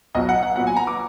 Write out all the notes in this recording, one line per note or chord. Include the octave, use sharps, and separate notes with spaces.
B1 B2 F#3 D#5
F#5
F#5
A#2 F#3 B3 F#5
G#5
A#5
D6